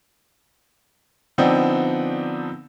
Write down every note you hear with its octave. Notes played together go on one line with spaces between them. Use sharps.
D3 F3 B3 C4 D4 D#4